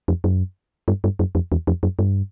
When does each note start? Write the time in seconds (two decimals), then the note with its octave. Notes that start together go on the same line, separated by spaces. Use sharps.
0.08 F2
0.24 F#2
0.88 G2
1.04 G2
1.19 F#2
1.35 F2
1.52 E2
1.67 F2
1.83 F#2
1.99 G2